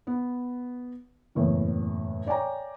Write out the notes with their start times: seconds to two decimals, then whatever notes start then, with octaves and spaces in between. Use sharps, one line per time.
0.07 B3
1.35 F#1 E2 A2
2.26 C#5 D5 G5 G#5 A#5